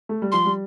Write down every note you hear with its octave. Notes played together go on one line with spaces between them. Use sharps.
A3
G3
F3 C6
G3